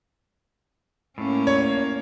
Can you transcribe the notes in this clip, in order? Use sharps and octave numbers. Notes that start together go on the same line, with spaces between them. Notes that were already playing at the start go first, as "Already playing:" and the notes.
A2 A#3 C#4
C#5